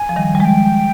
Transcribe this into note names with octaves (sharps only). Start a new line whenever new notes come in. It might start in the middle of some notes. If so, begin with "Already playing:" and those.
Already playing: G#5
F3
D#3 G3
G3
F3 G#3 G#5
G5